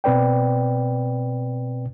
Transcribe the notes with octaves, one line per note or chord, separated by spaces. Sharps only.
B2 C4 B4 D5 G5